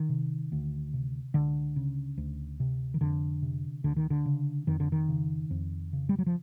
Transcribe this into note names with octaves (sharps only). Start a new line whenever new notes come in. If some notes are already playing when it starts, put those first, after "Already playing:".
Already playing: D#3
C3
D2
C3
C#2 D3
C#3
D2
C3
D#3
F2 D3
C3
D2 D3
D#3
D3
C#3
F2 D#3
D3
D#3
C#3
F2
C#3
G3
F#3
F3